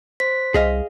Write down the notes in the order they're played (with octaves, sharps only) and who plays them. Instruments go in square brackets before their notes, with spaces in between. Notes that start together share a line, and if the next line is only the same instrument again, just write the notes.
[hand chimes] C5 B6
[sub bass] C2 [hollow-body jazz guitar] G#4 D#5 F5